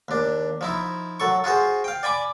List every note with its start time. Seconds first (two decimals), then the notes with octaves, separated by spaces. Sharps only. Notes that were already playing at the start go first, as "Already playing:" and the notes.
0.08 D#2 D4
0.61 F3 D#4 E4
1.20 F#3 A4 C#6
1.44 F4 F#4 G#4 C5
1.84 F5 G5
2.03 D5 G#5 B5 D6